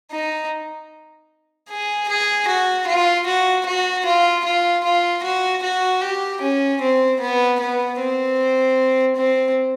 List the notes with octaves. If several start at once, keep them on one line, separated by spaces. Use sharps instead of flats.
D#4
G#4
G#4
F#4
F4
F#4
F#4
F4
F4
F4
F#4
F#4
G4
C#4
C4
B3
B3
C4
C4